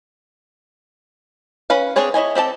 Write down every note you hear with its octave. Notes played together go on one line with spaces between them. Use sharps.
C#4 B4 F5
C4 D4 G#4 C#5 D5
E4 C#5 D#5 G#5
C4 G4 A4 A5